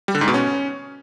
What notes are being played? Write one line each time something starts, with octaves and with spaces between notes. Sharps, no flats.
G3
D3
G#2
B2
C#4